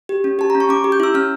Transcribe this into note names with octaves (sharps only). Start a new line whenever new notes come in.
G4
C#4
G4 A5
A#5
C#4
C#6
C#4 D6
G4
G6
E4 E6
C#4 F6